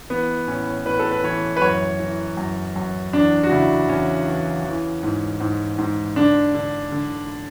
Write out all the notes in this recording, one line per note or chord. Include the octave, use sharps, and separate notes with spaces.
E3 B3
A2 C#4
A2 B4
A4
B4
E3 C#5
B4
F#2 C#5
E3
F#2
F#2
E2 D4
F#4
C#3 E4
E2 C#4
E3
E3
G#2
G#2
G#2
D3 D4
D3
D3